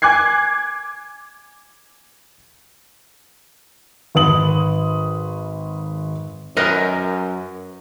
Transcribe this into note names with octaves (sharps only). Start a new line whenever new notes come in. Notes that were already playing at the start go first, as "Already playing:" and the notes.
G#5 D6 F#6 G#6 C7
G#1 B4 D#6 F#7
F#2 A#4 B4 D#5